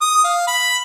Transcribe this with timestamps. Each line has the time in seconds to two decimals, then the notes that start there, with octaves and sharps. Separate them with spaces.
0.01 D#6
0.24 F5
0.47 B5